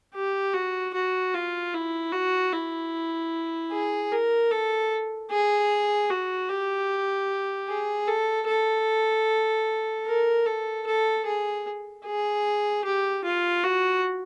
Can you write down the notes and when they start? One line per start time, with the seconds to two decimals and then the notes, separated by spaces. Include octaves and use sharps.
0.14 G4
0.54 F#4
0.94 F#4
1.34 F4
1.74 E4
2.12 F#4
2.53 E4
3.72 G#4
4.12 A#4
4.51 A4
5.30 G#4
6.10 F#4
6.49 G4
7.68 G#4
8.08 A4
8.48 A4
10.06 A#4
10.46 A4
10.86 A4
11.26 G#4
12.05 G#4
12.85 G4
13.24 F4
13.63 F#4